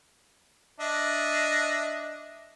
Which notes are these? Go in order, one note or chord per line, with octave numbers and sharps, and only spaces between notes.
D4 D#5 E5